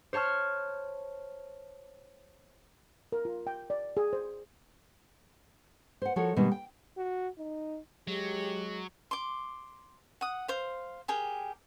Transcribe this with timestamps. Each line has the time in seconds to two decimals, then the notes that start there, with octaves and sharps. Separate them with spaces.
0.13 C5 C#5 A5 C#6 F6
3.12 A#4
3.25 F4
3.47 G5
3.70 D5
3.97 G#4
4.13 C5
6.02 C5 F#5
6.16 F3 F#4 A4 A#4 C#5
6.37 B2 D#3 G3 G#3 A#3
6.51 G5
6.97 F#4
7.38 D#4
8.08 F#3 G#3 G4
9.11 C6 D6
10.21 F#5 D#6
10.48 C5 F5
11.08 G4 G#4 A#4 G5